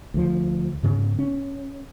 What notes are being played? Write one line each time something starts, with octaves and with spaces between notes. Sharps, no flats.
D2 F3
G#2 C#3 B3
C#4